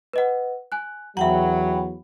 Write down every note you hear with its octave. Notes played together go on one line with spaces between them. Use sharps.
B4 D#5 F#5
G#5 F#6
E2 F#3 E5 F#5 G5 A#5 B5